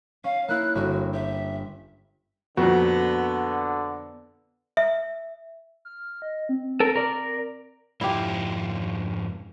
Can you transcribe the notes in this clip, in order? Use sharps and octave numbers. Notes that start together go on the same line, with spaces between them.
C#4 F5
A#3 E4 F#6
G1 F#4
G4 E5
F2 A#2 D3 B3 F#4
E5
F6
D#5
C4
C4 A4 A#4
A#4 D5
F2 G#2 E4 F4 G4